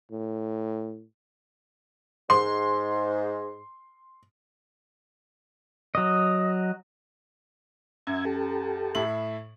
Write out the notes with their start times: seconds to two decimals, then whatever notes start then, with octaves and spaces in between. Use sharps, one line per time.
0.11 A2
2.30 G#2 C6
5.95 F#3 D#5
8.07 F#2 E5 G#6
8.25 G4 A4
8.95 A2 E4 F#7